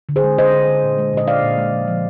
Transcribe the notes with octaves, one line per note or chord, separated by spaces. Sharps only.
D3
G#4 C5
G#3
G#3 C5 D#5
D3
D3
A#2
G#3
A#2 D#5
G#3 D5 F5
A#2
G#3
F3
F3